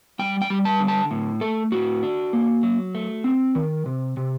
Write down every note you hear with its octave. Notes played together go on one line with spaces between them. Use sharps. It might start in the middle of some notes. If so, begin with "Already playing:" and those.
G3 G5
G5
G3
A5
D3
A5
A2
A3 A4
A2 F#4
D4
A#3
F#3
A3
C4
D#3
C3
C3